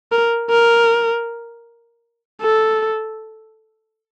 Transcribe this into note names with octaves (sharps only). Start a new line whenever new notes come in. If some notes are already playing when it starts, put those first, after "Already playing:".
A#4
A#4
A4